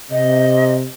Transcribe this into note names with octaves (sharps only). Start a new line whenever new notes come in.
C3 D#5